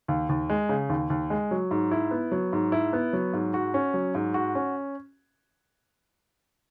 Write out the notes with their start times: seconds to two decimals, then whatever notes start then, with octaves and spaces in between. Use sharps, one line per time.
0.08 D#2
0.29 D#2
0.50 G#3
0.69 C#3
0.89 D#2
1.10 D#2
1.30 G#3
1.51 F#3
1.71 G#2
1.91 E4
2.11 B3
2.32 F#3
2.53 G#2
2.72 E4
2.93 B3
3.13 F#3
3.33 G#2
3.54 F#4
3.74 C#4
3.94 F#3
4.15 G#2
4.34 F#4
4.55 C#4